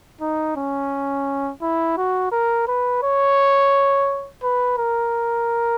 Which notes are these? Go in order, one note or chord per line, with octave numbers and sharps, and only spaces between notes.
D#4
C#4
E4
F#4
A#4
B4
C#5
B4
A#4